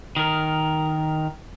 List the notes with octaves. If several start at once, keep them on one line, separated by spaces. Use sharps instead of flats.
D#3 A#4